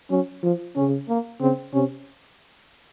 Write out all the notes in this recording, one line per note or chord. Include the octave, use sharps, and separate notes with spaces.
F#3 C#4
F3
C#3 C#4
A#3
C#3 C4
C3 C#4